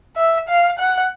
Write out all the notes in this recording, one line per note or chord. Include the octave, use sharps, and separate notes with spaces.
E5
F5
F#5